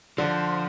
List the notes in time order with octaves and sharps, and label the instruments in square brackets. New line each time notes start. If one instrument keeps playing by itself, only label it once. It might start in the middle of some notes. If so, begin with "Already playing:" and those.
[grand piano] D3 [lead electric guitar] F3